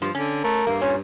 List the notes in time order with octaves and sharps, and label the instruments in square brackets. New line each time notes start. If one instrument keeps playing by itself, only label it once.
[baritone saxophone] G2 [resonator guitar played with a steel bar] F3
[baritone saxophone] D3 [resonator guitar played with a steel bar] C#4
[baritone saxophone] A3 [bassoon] A#4
[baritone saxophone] G2 [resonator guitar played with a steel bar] A#3
[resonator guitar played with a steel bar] A#2 [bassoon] C#4